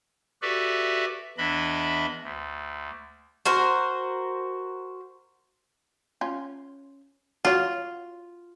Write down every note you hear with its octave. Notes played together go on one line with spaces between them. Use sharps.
F#4 G4 A4 B4 D5 E5
E2 E3 D4 D#5 E5 B5
D2
F#4 A#4 C5
C#4 F4
F4 F#4 C#5